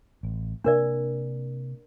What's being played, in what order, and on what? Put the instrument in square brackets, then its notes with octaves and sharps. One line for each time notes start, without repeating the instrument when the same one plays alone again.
[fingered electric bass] A1
[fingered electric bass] C3 A#3 [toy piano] D4 A#4 D5